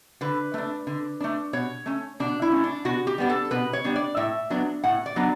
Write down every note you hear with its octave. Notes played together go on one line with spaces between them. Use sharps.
D3 B4
A3 D4
D3
A3 D4
B2 C#5
A3 C#4
B2 D4
E4
A3 C#4
D4
B2 F#4
G4
G3 B3 D4
A4
B2 B4
C#5
G3 B3 D4
D5
A2 E5
F#3 B3 D4
A2 F#5
D5
F#3 B3 D4